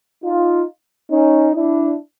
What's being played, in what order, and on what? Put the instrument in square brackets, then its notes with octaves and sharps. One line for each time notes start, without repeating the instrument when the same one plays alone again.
[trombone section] D#4 F4
C#4 D#4
D4 E4